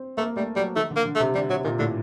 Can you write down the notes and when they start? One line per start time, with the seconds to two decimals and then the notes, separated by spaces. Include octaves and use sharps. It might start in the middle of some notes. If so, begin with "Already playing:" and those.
Already playing: C4
0.17 A3 A#3
0.37 G3 A3
0.56 F#3 G3
0.76 D#3 A3
0.91 D3
0.96 A#3
1.05 D3
1.15 A3
1.20 C3
1.35 D3 G3
1.50 C3 F#3
1.64 A#2 D#3
1.79 A2 D3